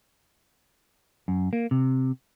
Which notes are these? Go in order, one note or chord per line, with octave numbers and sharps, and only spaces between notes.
F#2
A#3
C3